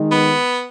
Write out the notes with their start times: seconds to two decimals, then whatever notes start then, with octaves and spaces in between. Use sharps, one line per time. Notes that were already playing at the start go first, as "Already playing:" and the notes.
Already playing: D#3 G#3 D#4
0.11 B3